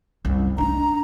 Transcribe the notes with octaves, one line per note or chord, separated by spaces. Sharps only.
C2 F#2
D4 D#4 A#5